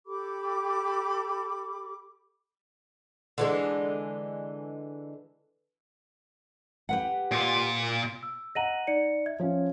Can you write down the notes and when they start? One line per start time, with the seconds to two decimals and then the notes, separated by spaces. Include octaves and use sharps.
0.05 G4 A4 B5 D6
3.38 D3 E3 G#3
6.89 G4 B4 F#5
7.32 A#2 F4
8.23 E6
8.55 D#5 F#5 A#5 A#6 D#7 F#7
8.87 D#4 D5 C#7
9.26 E5 G#6
9.40 F3 C#4